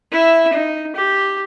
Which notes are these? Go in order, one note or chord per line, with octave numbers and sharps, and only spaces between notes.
E4 E5
D#4
G4